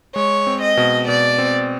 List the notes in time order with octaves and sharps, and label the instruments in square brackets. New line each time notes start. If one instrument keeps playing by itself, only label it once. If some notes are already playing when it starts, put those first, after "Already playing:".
[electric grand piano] G#3 [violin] C#5
[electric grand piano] C4
[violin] D#5
[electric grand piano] B2
[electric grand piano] B2 [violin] D5
[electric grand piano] C4